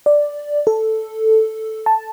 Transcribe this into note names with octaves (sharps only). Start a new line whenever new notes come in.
D5
A4
A5